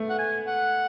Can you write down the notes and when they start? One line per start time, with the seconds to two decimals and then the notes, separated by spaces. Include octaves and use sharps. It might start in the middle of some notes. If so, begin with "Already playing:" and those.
Already playing: A3 B3
0.09 F#5
0.18 G#5
0.47 F#5